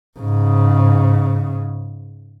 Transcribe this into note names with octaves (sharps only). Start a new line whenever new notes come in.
G#2 C#3